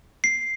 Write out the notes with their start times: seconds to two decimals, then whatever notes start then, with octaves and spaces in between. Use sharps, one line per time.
0.24 C7